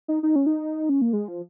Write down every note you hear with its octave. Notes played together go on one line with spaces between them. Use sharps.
D#4
D#4
C#4
D#4
C#4
A#3
G#3
F3